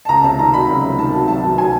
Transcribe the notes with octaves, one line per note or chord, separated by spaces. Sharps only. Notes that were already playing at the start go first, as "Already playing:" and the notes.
A5
C#2 A#5
C3 A5
D#3 A#5
F#3 B5
C#2
C3
D#3 A5
F#3
C2 A5
B2
F#3 G#5